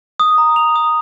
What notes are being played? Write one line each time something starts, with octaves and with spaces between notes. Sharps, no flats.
D#6
A#5
F7
D#6